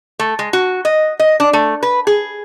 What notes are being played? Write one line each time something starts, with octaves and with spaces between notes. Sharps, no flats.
A3
G#3
F#4
D#5
D#5
D4
A3
B4
G#4